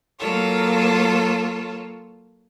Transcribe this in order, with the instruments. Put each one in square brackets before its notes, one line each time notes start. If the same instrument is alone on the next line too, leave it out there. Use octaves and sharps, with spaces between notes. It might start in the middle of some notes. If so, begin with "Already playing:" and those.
[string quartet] F#3 A#3 F4 A4 C#5